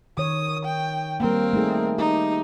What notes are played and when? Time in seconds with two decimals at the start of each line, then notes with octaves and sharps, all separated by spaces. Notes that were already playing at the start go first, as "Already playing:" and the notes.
0.18 D#3 C#5 D#6
0.65 G5
1.20 G3 A#3 C4 A#4
1.53 A3 D#4 G#4
1.98 D#4 G4